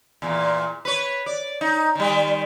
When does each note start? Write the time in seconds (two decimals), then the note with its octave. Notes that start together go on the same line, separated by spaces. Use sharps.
0.22 E2 A#2
0.85 B4 C#5
1.26 D5
1.61 D#4
1.95 D#3 G3